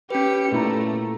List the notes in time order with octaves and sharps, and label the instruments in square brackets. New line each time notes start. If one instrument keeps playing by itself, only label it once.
[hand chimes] C#4 B4 [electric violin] G4 C#7
[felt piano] A#2 E4 A#5 [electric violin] A3